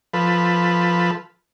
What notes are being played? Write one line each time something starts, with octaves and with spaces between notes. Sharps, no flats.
F3 A4 B4